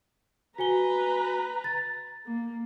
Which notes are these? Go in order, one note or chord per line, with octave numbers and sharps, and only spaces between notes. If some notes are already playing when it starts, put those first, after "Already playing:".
F#4 B4 G#5 A#5 G7
A6
A#3